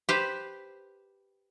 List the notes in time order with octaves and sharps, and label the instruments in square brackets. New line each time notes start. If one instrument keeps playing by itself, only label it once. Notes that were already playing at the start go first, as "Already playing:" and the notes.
[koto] G4 B4 C5